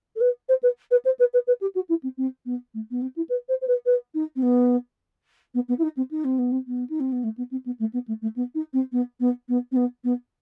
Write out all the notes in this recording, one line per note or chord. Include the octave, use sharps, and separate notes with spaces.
A4
B4
C5
B4
B4
C5
B4
B4
B4
G4
F#4
E4
C4
C4
B3
A3
B3
C4
E4
B4
C5
C5
B4
B4
D#4
C4
B3
B3
B3
E4
D#4
C4
D#4
C4
B3
C4
B3
D#4
C4
B3
A3
B3
C4
B3
A3
B3
A3
A3
B3
D#4
C4
B3
B3
B3
C4
B3
B3